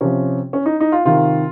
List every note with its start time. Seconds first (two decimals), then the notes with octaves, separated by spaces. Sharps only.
0.01 C3 F3 C#4
0.53 C#4
0.66 D#4
0.80 D#4
0.92 F4
1.05 C3 D#3 F4